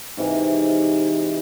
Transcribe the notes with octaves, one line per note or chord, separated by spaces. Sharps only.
G#2 C3 E3